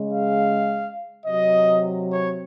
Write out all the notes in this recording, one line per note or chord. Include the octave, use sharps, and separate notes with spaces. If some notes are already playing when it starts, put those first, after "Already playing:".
Already playing: C#3 G#3
F5
C3 F#3 D#5
C#5